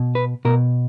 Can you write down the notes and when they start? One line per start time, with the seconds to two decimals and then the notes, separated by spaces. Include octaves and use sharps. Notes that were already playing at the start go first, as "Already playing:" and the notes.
Already playing: B2
0.15 B4
0.45 B2 A#4